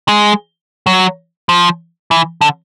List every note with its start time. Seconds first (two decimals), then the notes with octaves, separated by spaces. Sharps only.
0.09 G#3
0.87 F#3
1.49 F3
2.11 E3
2.41 D3